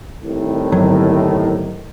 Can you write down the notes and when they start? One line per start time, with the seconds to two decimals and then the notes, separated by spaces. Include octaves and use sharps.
0.23 C2 A2 D#3
0.72 G1 F#3